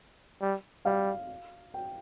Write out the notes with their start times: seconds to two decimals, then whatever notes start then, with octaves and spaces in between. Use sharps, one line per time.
0.41 G3
0.85 G3 F5
1.74 G5